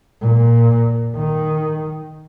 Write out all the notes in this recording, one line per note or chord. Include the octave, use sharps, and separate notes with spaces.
A#2
D#3